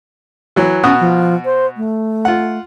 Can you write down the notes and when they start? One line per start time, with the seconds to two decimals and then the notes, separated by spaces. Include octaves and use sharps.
0.56 E3 F#3
0.83 B2 C#4 F#4 D#6
1.00 F3
1.45 C5
1.77 A3
2.25 F4 F#5